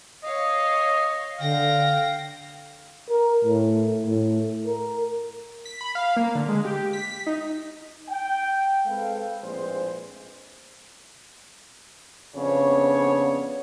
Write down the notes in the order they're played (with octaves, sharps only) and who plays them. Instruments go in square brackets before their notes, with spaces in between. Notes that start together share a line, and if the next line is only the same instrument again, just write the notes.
[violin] C#5 F5 [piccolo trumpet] D#5
[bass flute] D3 [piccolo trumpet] F5 [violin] G5 A#6
[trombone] A#4
A2
A2
A#4
[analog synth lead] B6
B5
F5
A#3
D3
G#3
G4
B6
D#4
[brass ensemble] G5
G#3 C4 A4 B4 F5
A#1 A2 G#3 C4 B4 C5
[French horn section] F2 C#3 B3 D4 C#5